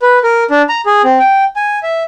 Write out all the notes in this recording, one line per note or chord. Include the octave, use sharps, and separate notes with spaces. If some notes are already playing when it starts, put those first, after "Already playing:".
B4
A#4
D4
A#5
G#4
C4
G5
G#5
E5